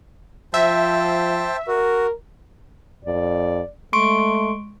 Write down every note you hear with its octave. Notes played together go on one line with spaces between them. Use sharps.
F3 C5 E5 G5 A5
F#4 A#4
F2 D5
G#3 A3 C6 C#6 D7